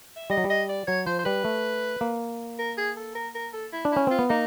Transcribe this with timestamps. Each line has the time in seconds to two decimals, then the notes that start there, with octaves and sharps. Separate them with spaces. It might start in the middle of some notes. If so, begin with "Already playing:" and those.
0.16 E5
0.30 G3 D#5
0.37 F#3
0.44 G3
0.50 D#5
0.69 D5
0.87 F#3 C#5
1.06 F3 C5
1.19 C5
1.25 G3 B4
1.45 A3
2.01 A#3
2.59 A#4
2.77 G#4
2.97 A4
3.15 A#4
3.35 A#4
3.53 A4
3.72 E4
3.85 D4
3.92 C#4 E4
4.07 C4 F4
4.19 B3
4.29 A#3 D#4